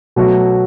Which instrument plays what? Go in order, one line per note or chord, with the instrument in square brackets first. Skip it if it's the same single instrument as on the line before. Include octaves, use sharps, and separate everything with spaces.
[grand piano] B2 F#3 A3 F#4